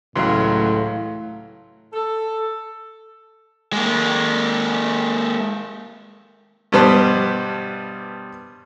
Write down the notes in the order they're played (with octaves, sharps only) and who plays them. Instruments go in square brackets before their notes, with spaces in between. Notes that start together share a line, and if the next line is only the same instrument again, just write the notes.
[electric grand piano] C#2 E3 F#3 [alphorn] A2 [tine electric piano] F5 C6
[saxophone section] A4
[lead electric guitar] G#3 A#3
[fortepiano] G2 B2 G3 B4 C5 A5